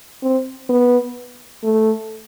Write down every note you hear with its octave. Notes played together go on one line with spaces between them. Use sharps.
C4
B3
A3